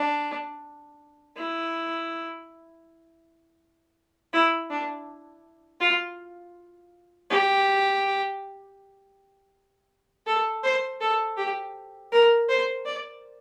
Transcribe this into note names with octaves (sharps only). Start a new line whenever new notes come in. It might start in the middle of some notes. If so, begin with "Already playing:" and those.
Already playing: D4
E4
E4
D4
F4
G4
A4
C5
A4
G4
A#4
C5
D5